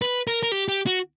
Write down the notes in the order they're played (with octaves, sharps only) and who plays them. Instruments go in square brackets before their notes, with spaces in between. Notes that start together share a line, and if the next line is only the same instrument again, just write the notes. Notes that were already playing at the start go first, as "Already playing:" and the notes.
[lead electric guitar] B4
A#4
A#4
G4
G4
F#4